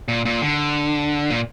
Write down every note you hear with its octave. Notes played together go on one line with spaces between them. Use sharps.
A#2
A#2
D3
A#2